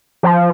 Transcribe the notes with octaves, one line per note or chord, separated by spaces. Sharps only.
F3